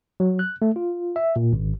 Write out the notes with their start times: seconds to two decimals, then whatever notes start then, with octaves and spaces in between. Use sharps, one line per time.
0.20 F#3
0.39 F#6
0.62 A3
0.76 F4
1.16 E5
1.36 A#2
1.53 G#1